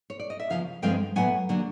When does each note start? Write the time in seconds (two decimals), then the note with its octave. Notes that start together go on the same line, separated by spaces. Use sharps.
0.10 C#5
0.19 D5
0.30 D#5
0.40 E5
0.50 E2 C#3 F3 F5
0.82 G2 D3 F3 G#3 C4 F5 G5
1.16 A2 F#3 B3 F#5 G#5
1.49 D3 F#3 A#3 D4